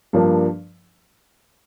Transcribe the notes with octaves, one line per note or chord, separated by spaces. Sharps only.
G2 F3 A#3 D4